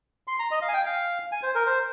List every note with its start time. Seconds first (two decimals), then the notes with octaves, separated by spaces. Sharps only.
0.28 C6
0.39 A#5
0.51 D#5
0.62 F5
0.68 G#5
0.74 G5
0.86 F5
1.32 G#5
1.43 C5
1.55 A#4
1.66 C5